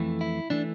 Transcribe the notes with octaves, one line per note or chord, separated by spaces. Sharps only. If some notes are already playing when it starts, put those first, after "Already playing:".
Already playing: F2 E3 A3
E4
E3 A3 D4